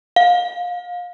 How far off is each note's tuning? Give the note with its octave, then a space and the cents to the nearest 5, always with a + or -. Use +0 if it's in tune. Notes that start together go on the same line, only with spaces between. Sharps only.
F5 +25